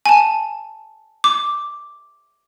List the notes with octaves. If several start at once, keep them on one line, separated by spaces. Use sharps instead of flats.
G#5 A5
D6